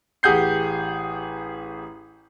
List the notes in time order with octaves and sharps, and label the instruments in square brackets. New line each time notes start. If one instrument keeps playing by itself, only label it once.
[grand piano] A1 G4 G#4 F#5 G6 C7